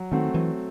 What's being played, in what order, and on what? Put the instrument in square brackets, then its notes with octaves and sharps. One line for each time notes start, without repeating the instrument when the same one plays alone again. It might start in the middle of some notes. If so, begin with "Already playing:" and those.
Already playing: [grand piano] F#3
[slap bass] D#3 [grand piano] A3 C4 F#4
[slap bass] E3 [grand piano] F#3